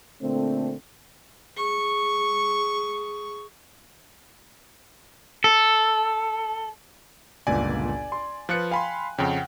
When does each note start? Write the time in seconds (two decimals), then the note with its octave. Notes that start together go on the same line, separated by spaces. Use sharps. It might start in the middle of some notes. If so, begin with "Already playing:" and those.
0.22 A#2 D3 A3 C4
1.57 G#4 C#6
5.44 A4
7.47 G1 C#2 A#2 D5 G#5
8.12 C6
8.49 F3 F4 B4 F#6 C#7
8.71 F5 G5 G#5 B5 C6
9.18 F2 C#3 F#5 G5